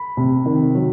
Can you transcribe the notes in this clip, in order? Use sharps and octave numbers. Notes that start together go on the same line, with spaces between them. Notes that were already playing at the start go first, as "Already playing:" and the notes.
Already playing: B5
C3
D#3
F#3